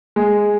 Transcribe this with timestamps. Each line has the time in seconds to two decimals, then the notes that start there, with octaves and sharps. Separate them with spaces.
0.16 G#3